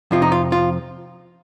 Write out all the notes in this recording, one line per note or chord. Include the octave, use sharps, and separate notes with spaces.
F2 C3 F3 F4
D#4
F4
F4